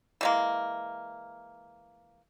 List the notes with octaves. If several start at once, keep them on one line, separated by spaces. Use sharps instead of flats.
E3 G#3 A#3